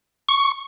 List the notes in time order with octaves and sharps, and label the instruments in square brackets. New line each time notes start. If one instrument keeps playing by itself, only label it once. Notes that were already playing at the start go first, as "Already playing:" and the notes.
[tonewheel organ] C#6